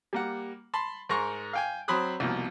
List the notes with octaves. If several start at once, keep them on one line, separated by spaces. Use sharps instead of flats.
G3 A#3 F#5
A5 B5 C6
G#2 A#4 A#5 C6 C#6
F5 G5 G#5
F#3 C4 B5 C6 D#6 F#6
C2 B2 F3 A#3